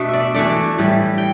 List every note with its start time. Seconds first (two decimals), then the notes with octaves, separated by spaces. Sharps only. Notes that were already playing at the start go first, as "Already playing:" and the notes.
Already playing: B2 A3 D4
0.09 D5 E5
0.34 E3 A3 D4 D5
0.78 A2 E3 G3
1.18 G5